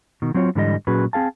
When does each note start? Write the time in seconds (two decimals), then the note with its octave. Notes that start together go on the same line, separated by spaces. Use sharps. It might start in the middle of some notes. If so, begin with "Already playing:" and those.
0.22 B2 D#3
0.34 F#3 C4 F4 C#5
0.55 G#2 D3 E3 G3 A4 D#5
0.87 A#2 F#3 C#4 F#4 G#4 B4
1.13 C4 G#4 F5 A5